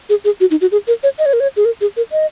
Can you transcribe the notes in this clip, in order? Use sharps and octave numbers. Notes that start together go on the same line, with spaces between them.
G#4
G#4
F#4
D#4
F#4
G#4
A#4
C#5
D#5
C#5
A#4
C#5
G#4
A#4
G#4
A#4
D#5